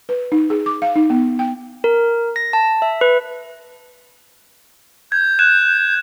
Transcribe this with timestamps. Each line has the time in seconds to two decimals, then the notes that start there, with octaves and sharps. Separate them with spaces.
0.09 B4
0.32 D#4
0.50 G#4
0.66 D6
0.82 F5
0.96 D#4
1.10 B3
1.39 G5
1.84 A#4
2.36 A#6
2.53 A5
2.82 E5
3.01 B4
5.12 G6 G#6
5.39 F#6 G#6 E7